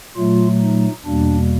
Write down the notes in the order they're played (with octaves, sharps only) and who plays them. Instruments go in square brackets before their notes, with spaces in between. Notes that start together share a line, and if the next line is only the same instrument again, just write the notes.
[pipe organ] A#2 F#3 A3 F4
D#4
E2 B2 G3 A#3 D4